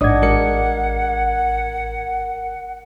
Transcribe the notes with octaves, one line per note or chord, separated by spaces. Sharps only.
A1 G#2 D4 D5 D#5 F#5 D#6 G#6
G#1 G#3 A#4 C#7